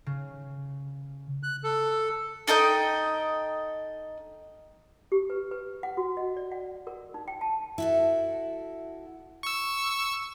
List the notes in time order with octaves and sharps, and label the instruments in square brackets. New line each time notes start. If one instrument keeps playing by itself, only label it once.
[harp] C#3
[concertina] F#6
A4
[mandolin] D#4 A4 D#5 G5
[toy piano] G4
B4
B4
F#5
F#4
D#5
D5
F#5
A#4
D#4
G5
A5
[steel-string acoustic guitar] E4 F#4 A4
[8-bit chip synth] C#6 E6